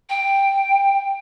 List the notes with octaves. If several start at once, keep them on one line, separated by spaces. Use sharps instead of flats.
G5